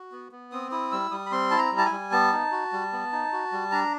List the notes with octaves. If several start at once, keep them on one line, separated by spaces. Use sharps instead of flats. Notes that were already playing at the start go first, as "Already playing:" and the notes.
Already playing: F#4
B3
B3
C4 D#6
E4 D#6
G3 E6
G3 D#6
B5
C4 C6
E4 A5
A#5
G3
A5
G#5
G3
B3 A5
D#4
F#4
G3
B3
D#4
F#4
G3
D4 A#5